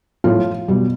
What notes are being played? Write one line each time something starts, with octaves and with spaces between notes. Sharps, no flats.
A2 F3 F4
B2 G3